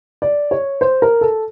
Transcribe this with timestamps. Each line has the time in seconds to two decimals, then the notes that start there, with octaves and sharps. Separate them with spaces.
0.22 D5
0.51 C#5
0.81 C5
1.02 A#4
1.21 A4